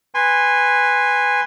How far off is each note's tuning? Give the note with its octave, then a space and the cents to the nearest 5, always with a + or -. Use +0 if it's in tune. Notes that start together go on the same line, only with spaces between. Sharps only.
B4 +0 G#5 -15 C6 +5